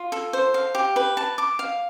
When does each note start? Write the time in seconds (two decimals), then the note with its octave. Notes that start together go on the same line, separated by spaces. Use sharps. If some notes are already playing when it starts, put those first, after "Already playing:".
Already playing: F4
0.12 A4
0.33 C5
0.54 F5
0.75 G4
0.96 B4
1.17 A5
1.38 D6
1.59 F5